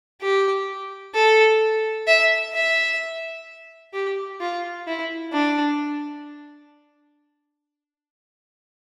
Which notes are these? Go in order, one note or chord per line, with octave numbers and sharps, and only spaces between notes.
G4
A4
E5
E5
G4
F4
E4
D4